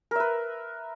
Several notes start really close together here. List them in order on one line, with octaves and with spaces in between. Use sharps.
A#4 E5 B4